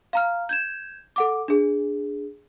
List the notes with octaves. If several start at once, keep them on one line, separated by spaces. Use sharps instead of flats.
F5 A#5 F6
G6 G#6 E7
A4 F#5 D6
D4 G#4